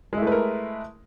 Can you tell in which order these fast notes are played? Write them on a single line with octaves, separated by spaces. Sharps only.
G#3 E4 A3 B4 A#4